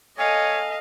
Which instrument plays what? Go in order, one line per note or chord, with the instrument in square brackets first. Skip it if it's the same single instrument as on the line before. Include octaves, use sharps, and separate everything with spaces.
[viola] A4 F5 [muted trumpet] C#5 [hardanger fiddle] D#5 [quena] G#5